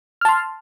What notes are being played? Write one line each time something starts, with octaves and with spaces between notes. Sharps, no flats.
A5 C6 F6